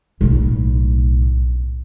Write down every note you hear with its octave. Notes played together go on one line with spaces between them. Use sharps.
B1 A2